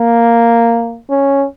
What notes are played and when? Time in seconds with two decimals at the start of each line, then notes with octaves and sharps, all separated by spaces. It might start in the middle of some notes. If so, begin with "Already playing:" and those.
Already playing: A#3
1.10 C#4